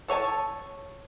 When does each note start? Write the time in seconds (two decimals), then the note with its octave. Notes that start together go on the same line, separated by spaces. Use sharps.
0.08 A4 C#5 G#5 A5